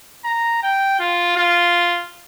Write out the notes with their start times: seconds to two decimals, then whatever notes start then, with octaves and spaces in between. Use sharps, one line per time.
0.25 A#5
0.63 G5
1.00 F4
1.37 F4